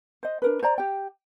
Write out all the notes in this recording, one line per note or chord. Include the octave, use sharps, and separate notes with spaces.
C5 D#5
D4 A#4 B4
C5 D5 A#5
G4 G5